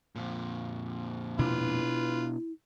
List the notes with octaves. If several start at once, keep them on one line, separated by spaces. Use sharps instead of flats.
F2 A#2
B2 D4 E4 F4 B4